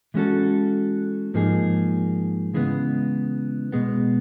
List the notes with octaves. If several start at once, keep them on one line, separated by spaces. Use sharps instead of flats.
E3 G#3 C#4 F#4 A4
G#2 F3 A#3 D#4 G#4
C#3 E3 G#3 B3
B2 G#3 B3